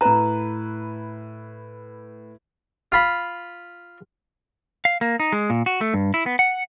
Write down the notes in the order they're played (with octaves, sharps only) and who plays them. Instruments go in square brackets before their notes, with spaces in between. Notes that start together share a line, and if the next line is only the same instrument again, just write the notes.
[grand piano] A2 B4 [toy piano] A#5
[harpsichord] F4 B5
[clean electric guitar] F5
A#3
D#4
G#3
A#2
F#4
A3
G2
E4
B3
F#5